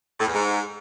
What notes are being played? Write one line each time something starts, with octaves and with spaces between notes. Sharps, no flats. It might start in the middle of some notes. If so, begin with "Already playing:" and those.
A2
E2
G#2